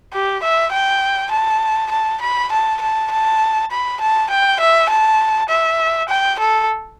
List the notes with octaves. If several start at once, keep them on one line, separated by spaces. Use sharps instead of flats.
G4
E5
G5
A5
A5
B5
A5
A5
A5
B5
A5
G5
E5
A5
E5
G5
A4